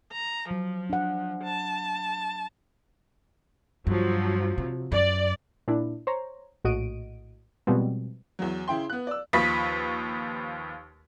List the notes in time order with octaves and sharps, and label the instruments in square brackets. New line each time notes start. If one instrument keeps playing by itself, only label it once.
[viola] A#5
[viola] F3 [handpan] F#3
[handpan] D4 F#5
[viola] A5
[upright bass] G2 [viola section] F3 F#3
[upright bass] C3
[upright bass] F#2 [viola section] D5
[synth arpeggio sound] A#2 D4 E4
C5 C#5 A#5
A#1 A2 F#4 D#5 D7 D#7
B2 F3 G3 G#3 B3 C4
[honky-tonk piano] E2 F#3
C#3 E4 G5 C6
B3 F#6
D5 E6
D#2 F3 B4 B5 C#6 B6